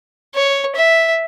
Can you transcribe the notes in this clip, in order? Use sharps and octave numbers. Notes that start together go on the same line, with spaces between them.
C#5
E5